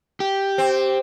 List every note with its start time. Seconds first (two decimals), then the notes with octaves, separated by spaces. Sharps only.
0.20 G4
0.58 C4